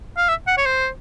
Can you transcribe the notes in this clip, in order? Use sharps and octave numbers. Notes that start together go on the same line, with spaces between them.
F5
E5
F#5
C#5
C5